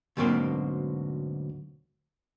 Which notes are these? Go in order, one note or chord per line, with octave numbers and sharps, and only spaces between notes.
D2 G#2 B2 F#3 A#3 C4